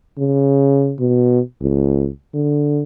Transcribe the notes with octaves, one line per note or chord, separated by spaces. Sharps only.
C#3
B2
C#2
D3